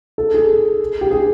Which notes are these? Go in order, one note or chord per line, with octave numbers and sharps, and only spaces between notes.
A4
G#4
G4
G#4